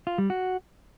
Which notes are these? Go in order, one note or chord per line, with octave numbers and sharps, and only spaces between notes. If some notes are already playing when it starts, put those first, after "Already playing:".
F4
G3
F#4